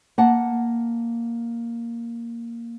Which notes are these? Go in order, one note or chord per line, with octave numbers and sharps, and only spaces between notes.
A#3 F#5 A5